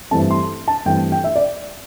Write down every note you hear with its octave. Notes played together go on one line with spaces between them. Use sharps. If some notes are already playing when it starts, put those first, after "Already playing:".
G2 E3 A3 C4 A5
C6
A5
G2 E3 A3 C4 G5
G5
E5
D5